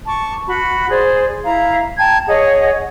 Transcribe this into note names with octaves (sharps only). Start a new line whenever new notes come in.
A5 C#6 D6
F#4 B5
G#4 C5 D5
E4 F5 A#5
G5 A5 A#5 G#6
G#4 C#5 D#5 F#5